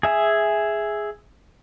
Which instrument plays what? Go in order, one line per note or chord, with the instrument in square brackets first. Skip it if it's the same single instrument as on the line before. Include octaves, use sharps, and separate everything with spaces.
[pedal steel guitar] G#4 E5 G#5